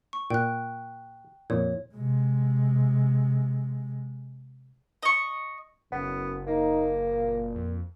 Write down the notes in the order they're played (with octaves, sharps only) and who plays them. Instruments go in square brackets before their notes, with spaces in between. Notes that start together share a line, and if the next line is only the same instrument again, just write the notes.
[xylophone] C#6
[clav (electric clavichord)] A#2 [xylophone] G5 F#6
[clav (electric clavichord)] F2 A#2 [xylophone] C#5
[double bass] C3 G#3
[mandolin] D#5 C#6
[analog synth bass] F#1 [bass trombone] F#2 [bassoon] B3
[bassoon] A#3 [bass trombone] D#4
[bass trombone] A#2
[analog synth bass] F2